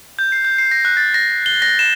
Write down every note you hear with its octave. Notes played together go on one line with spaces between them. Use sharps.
G6
C7
G6
C7
A#6
F#6
A6
A#6
G7
A#6
E7